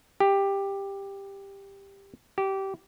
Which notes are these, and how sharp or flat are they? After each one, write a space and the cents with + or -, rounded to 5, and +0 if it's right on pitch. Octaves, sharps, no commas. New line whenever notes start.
G4 +10
G4 -20